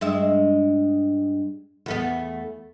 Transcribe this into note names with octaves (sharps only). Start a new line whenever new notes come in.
G2 G#3 E5
E2 A3 B3